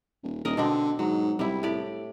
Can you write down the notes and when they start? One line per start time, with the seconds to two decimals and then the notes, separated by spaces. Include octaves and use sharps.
0.23 D#1
0.45 D#1 A#4 D5 D#5
0.57 B2 D3 C4 D4
0.99 G#2 F#3
1.39 C2 G3 E4
1.63 A2 G4 D5